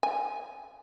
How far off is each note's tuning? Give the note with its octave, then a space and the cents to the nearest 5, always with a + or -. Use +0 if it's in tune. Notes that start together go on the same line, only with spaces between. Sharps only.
G#5 -10